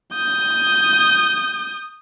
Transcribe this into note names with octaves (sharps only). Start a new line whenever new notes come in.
D#6 G6